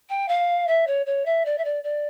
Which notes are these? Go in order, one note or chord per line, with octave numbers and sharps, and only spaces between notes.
G5
F5
E5
C#5
C#5
E5
D5
E5
D5
D5